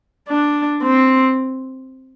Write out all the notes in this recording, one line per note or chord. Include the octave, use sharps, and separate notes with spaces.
D4
C4